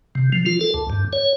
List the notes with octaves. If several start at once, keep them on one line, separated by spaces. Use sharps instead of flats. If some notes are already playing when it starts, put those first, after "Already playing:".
C3
F3
F4
A4
D2
G2
C#5